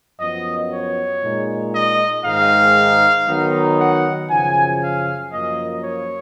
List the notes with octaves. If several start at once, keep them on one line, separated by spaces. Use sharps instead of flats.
F#2 F3 B3 D#5
C#5
A#2 G#3 D#4
D#5
G#2 D#3 G#3 D#4 F5
D#3 F#3 B3 D#4
F#5
F#2 C#3 F3 G#5
F5
F#2 F3 A#3 D#5
C#5